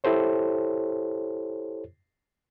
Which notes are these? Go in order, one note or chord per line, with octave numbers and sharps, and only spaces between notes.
E4 G4 A4 C5 C#5